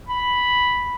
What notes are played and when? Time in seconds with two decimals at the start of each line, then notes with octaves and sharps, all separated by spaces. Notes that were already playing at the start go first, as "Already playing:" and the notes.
0.09 B5